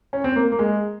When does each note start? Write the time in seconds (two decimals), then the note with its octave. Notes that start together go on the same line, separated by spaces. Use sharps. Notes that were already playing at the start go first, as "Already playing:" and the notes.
0.13 C#4
0.24 C4
0.36 A#3
0.52 A#3
0.59 G#3